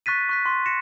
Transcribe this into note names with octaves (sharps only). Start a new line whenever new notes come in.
C#6 F#6 A6 B6 D#7
C#6 F#6 B6
C6 C#6 B6
A#6 C#7 E7